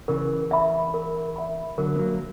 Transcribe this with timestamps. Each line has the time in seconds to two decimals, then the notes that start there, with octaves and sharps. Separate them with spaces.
0.08 C#3 E3 A#4
0.51 E5 B5
0.94 A#4
1.36 E5 B5
1.78 D3 F#3 A#4
1.96 B3
1.99 F#3 A#3